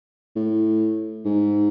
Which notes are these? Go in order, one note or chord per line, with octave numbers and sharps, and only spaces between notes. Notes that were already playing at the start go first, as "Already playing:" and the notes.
A2
G#2